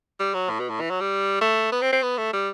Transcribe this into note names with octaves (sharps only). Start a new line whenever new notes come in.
G3
F#3
A2
B2
A2
E3
F#3
G3
A3
B3
C4
C4
B3
A3
G3